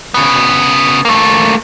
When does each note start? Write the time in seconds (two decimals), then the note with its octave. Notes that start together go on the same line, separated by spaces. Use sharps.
0.14 C#3 B3
1.05 A3 A#3